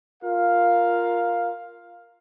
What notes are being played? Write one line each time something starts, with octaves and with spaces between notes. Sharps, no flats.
F4 A#4 F5